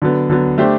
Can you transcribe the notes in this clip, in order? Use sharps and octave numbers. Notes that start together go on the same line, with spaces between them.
D3 F#3 B3
D3 F#3 B3
A3 D4 G4 C5